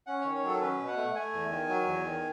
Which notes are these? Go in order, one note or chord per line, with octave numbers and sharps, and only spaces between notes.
C#4 F#5
D#3 C#5
C#5
F#3 A4
C#4 B4
B2
F#5
A3
A3 G#5
E2
D#3
F#3
E2
D#3